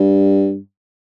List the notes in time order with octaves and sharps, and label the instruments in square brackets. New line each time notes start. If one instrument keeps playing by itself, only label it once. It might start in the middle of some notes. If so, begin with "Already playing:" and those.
Already playing: [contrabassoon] G2